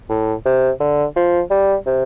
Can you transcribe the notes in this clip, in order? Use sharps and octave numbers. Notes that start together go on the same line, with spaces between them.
A2
C3
D3
F3
G3
C3